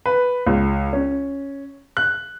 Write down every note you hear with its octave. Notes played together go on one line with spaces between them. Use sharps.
B4
C#2
C#4
F#6